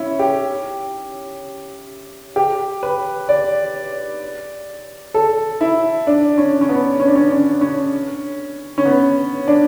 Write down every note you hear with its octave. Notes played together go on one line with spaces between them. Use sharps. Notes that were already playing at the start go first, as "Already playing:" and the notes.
Already playing: C#4 E4
G4
G4
B4
D5
A4
E4
D4
C#4
C#4
B3
C#4
D4
C#4
C#4
C#4
C#4
B3
D4